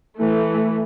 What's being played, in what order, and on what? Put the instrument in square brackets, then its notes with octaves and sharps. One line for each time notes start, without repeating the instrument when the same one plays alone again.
[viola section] E3 A3